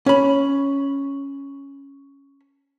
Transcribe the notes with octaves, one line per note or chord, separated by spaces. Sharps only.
C#4 B5